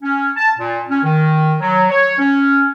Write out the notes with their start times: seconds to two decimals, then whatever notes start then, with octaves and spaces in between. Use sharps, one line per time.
0.03 C#4
0.37 A5
0.59 A#2
0.90 C#4
1.03 D#3
1.60 F#3
1.90 C#5
2.18 C#4